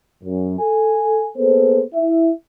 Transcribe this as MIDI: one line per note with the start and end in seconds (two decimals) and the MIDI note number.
0.24 0.58 42
0.59 1.28 69
0.59 1.28 80
1.36 1.82 58
1.36 1.82 59
1.36 1.82 68
1.36 1.82 69
1.36 1.82 72
1.94 2.30 64
1.94 2.30 76